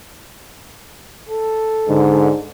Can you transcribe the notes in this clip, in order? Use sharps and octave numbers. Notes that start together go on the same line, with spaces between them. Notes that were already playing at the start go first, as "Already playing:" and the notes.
A4
G#2 D3